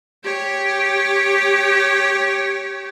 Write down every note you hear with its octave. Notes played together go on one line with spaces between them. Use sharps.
G4 C#5